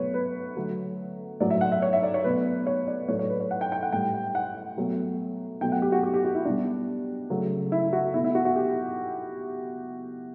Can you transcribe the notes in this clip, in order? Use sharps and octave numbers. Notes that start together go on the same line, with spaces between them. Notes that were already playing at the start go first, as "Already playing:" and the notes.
Already playing: B2 F#3 A3 B4 C#5
B4
D3 F#3 A3
A2 F#3 A3 D5
E5
F#5
E5
C#5
E5
D5
C#5
B2 F#3 A3 B4
C#5
D5
A2 F#3 A3 C#5
C#5
B4
C#5
F#5
G5
G5
F#5
A2 G3 G5
F#5
B2 F#3 A3
B2 F#3 A3 G5
F#5
G4
F#4
G4
G4
F#4
E4
B2 G3 D4
C#3 F#3 A3
E4
F#4
B2 A3 E4
E4
F#4
F#4
G4